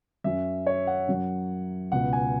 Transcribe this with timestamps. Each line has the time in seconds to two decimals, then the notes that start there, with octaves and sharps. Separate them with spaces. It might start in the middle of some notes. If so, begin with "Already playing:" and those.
0.24 F#2 F#3 C#4 E5
0.67 C#5
0.87 F#5
1.08 F#2 F#3 C#4
1.92 C#2 B2 B3 F#5
2.13 G#5